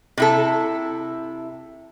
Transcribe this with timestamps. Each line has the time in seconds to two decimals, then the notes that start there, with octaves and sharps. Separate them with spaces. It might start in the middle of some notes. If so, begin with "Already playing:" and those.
0.18 C3 E4 A4